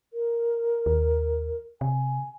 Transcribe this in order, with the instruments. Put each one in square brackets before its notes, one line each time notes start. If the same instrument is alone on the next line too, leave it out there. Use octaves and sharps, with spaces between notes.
[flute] A#4
[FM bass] D#2
[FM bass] C3 [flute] G#5